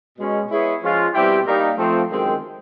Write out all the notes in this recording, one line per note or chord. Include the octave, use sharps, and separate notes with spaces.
B2 G#3 C#4
G#3 B3 E4 G#4 C#5
F3 G#3 C#4 F4
B2 G3 C4 E4 G4
G3 A#3 D#4
F3 A3 C4
F#2 D#3 G#3 C4